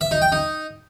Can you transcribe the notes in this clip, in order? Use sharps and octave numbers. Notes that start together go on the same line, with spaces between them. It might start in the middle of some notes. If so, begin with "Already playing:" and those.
E5
D#4
G5
D#4